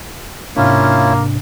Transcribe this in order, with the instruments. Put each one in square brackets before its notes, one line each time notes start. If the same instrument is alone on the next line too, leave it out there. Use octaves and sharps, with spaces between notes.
[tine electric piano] G#2 C3 D4 [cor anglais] A#3 [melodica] C#4 E4 F4